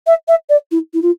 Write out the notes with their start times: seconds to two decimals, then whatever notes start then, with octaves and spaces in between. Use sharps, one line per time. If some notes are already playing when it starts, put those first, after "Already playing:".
0.07 E5
0.28 E5
0.49 D5
0.71 E4
0.93 E4
1.02 F4